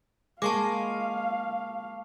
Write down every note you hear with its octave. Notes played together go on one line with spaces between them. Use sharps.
G#3 A#3 F5 A5 C#6 D6